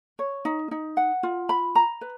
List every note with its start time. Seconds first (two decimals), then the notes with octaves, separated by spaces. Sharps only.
0.19 C#5
0.45 D#4
0.71 D#4
0.97 F#5
1.23 F4
1.49 B5
1.75 A#5
2.01 B4